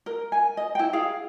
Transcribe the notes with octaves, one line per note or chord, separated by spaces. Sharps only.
A#4
G#5
D#5
E4 G5
E4 G#4 F5